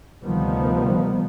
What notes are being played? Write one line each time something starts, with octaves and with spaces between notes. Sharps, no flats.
D2 C3 D#3 F3 G3 B3